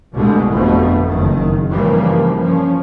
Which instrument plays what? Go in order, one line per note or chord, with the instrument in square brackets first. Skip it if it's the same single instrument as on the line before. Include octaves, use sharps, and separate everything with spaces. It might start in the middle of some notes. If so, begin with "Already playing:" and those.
[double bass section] C2 G2 B2 D3 G#3 A3
G1 F2 B2 F3 A3
F#1 D#3
G2 C#3 E3 F3 G3 A#3
F3 C#4